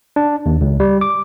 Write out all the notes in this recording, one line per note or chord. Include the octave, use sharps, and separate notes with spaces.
D4
D#2
C#2
G3
D6